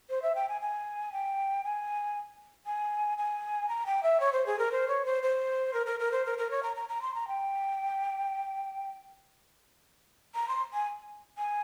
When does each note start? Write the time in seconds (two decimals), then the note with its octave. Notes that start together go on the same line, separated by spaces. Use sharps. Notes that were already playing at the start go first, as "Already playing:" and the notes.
0.10 C5
0.22 E5
0.35 G5
0.49 G#5
0.61 G#5
1.13 G5
1.64 G#5
2.66 G#5
3.18 G#5
3.69 A#5
3.86 G5
4.03 E5
4.20 C#5
4.33 C5
4.46 G#4
4.59 A#4
4.72 C5
4.88 C#5
5.05 C5
5.23 C5
5.74 A#4
5.86 A#4
6.00 A#4
6.12 C5
6.26 A#4
6.38 A#4
6.51 C#5
6.63 A#5
6.76 A#5
6.89 A#5
7.02 C6
7.15 A#5
7.28 G5
10.35 A#5
10.48 C6
10.74 G#5
11.38 G#5